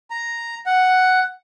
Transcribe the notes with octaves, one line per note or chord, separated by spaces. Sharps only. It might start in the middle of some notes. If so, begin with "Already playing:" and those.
A#5
F#5